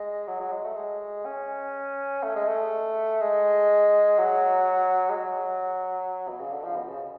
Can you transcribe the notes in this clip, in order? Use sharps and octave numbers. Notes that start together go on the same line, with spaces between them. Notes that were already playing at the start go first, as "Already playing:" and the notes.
Already playing: G#3
F#3
F#3
G#3
A3
G#3
C#4
A3
G#3
A3
G#3
F#3
G#3
F#3
B2
C#3
D3
F3
B2
C#3